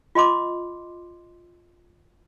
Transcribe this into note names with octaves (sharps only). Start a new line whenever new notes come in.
F4 D#5 C6 D6